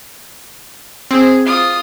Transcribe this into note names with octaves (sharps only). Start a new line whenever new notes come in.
C4 G#4
F4 D#6